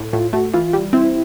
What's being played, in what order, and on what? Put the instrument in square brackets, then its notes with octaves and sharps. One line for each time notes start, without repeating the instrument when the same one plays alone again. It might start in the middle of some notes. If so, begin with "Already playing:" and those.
Already playing: [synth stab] A2
[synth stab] A2 [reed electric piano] F4
[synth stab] A3 [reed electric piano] F#4
[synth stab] E3 [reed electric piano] F4
[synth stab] G3
[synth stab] C4 [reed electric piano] E4